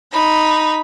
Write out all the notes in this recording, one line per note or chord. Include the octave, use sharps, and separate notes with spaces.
D#4 B5